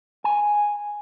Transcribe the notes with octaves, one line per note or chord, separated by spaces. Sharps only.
G#5